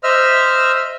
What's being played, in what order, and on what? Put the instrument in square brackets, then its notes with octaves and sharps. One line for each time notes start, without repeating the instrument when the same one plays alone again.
[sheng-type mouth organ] C5 D#5 E5 E6 F6